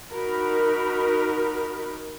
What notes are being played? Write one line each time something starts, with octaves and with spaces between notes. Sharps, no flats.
D#4 F#4 A#4 B5